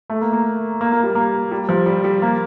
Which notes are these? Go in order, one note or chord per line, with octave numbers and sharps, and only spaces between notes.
A3
A#3
A#3
A#3
A#3
G3
A#3
G3
F3
G3
G3
A#3